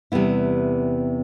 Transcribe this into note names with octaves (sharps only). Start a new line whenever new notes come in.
E2 C3 G3 B3 E4